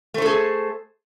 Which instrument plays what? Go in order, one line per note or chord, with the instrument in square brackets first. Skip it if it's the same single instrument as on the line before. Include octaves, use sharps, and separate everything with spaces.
[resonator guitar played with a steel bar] A3
C5
A4
G#4